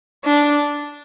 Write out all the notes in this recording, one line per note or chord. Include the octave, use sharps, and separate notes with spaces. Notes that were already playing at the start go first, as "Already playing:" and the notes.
D4